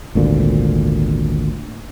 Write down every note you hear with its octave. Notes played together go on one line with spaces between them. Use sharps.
G#1 D2 A#2